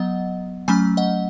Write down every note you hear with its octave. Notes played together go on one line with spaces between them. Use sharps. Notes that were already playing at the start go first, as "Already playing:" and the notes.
Already playing: F#3 B3 D#5 F#5
F#3 A3 C#4 G#5 B5
D#5 F#5